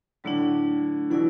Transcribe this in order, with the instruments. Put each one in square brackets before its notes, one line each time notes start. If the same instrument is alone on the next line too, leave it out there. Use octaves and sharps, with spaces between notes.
[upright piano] A2 D3 [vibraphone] F#3 A3 D4
[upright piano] B2 E3 [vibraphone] E4 D5 F#5